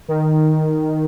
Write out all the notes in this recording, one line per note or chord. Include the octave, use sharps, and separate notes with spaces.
D#3